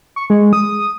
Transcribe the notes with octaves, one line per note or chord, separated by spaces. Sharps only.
C#6
G#3
D#6